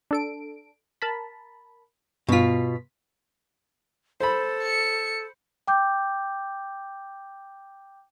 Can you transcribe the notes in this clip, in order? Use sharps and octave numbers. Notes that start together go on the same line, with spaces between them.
D4 A4 D7
A#4 A5 B5
G2 B2 F4 B6
A4 C5 B5
C#7
G5 D6 G6